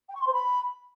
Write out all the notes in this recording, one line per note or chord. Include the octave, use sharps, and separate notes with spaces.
G5
C#6
C6
C5
B5